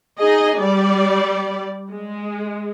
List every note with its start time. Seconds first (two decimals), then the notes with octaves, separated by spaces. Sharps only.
0.18 D#4 G#4 D#5
0.57 G3 D5
1.92 G#3